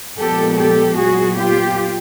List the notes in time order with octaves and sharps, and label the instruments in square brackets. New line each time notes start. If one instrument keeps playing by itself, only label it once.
[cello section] A#2 F3 G#3 B3 G4 A4
G4 A4
A#2 F#3 B3 F#4 G#4
F4 G4